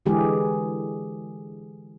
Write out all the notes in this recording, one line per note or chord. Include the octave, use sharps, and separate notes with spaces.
D3 E3 G#3 G4 G#4